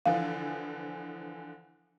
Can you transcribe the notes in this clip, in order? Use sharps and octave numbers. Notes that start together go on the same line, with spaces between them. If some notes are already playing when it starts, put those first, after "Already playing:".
D3 E3 F3 F5